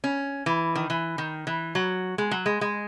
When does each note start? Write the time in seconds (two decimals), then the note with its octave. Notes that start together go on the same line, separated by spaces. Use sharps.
0.04 C#4
0.46 E3
0.75 D#3
0.90 E3
1.18 D#3
1.47 E3
1.75 F#3
2.18 G#3
2.31 F#3
2.46 G#3
2.61 G#3